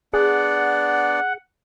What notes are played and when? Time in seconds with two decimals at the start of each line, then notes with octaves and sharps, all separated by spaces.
0.13 B3 D4 G#4 D5 F#5